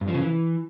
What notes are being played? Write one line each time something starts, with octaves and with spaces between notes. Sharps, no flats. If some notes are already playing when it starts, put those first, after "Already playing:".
G2
F3
C#3
E3